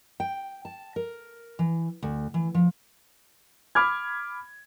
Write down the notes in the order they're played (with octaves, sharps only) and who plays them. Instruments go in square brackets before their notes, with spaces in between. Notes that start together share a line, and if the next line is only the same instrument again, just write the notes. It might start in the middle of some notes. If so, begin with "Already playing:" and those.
[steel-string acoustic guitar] G5
A5
A#4
E3
D2
E3
F3
[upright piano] B5 D6 F6 G#6